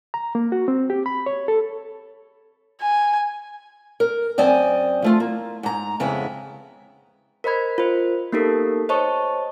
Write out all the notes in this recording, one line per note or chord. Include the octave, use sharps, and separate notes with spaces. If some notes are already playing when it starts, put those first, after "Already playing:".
A#5
A#3
F#4
C4
G4
B5
C#5
A4
G#5
A#4
F#2 C4 D5 D#5 G#5
F3 A3 F4
A#3
G#2 A#5
F2 C#3 G#3 B3 E4
A#4 C5 D#5 B5 G#6
F4 A#4 C5
A#3 B3 D#4 G4 A4 A#4
C5 C#5 D#5 A5 C#6